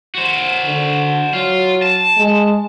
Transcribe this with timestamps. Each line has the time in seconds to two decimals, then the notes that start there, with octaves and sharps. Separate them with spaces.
0.15 F#4 C5
0.65 D3
1.33 F#3 F4
1.82 A5
2.18 G#3